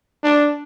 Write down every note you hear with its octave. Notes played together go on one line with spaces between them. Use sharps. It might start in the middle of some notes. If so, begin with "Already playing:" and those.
D4